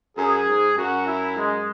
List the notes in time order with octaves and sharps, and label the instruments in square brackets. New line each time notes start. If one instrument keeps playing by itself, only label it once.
[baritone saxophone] F#2 [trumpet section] G#4
[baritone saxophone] G#2
[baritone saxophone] F#2 [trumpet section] F#4
[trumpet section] E4
G#3